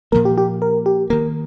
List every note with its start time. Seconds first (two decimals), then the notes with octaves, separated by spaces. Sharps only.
0.12 A#2 F3 A#3 A#4
0.25 G4
0.38 G4
0.62 A#4
0.86 G4
1.10 D#3 A#3 A#4